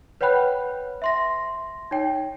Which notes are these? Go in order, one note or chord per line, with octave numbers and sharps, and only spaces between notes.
B4 C#5 F#5 G5 B5 F#6
E5 C6 A#6
D#4 C#5 G5